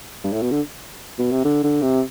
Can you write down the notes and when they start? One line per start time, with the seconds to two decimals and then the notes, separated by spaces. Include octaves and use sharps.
0.24 G2
0.33 A2
0.42 B2
0.51 D3
1.19 B2
1.32 C3
1.45 D3
1.63 D3
1.82 C3